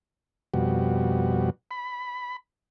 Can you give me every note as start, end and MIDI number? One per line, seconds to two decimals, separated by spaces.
0.54 1.50 41
0.54 1.50 47
0.54 1.50 55
0.54 1.50 66
1.71 2.36 83